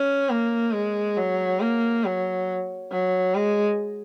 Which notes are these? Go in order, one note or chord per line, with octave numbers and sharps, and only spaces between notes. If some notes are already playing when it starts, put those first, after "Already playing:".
Already playing: C#4
A#3
G#3
F#3
A#3
F#3
F#3
G#3